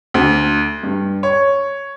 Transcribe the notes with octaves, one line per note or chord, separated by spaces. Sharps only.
D2
G2
C#5